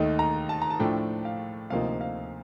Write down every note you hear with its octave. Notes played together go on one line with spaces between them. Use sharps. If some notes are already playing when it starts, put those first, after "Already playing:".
Already playing: D#2 D#3 A3 D#4
A#5
A5
A#5
A5
A2 F3 A3 D4 G5
F5
D2 C3 F3 A#3 D#4 F5
F5